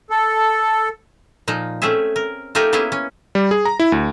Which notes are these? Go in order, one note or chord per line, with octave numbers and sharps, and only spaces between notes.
A4
A#2 F3 D#4
A3 C4 C#4 G#4 E5
A#4
A3 D#4 F4 G4 A#4 G#5
A#3 B3 C#4 E4 G#4
C#4
G3
G#4
A#5
E4
D2